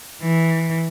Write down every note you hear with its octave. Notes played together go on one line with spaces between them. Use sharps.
E3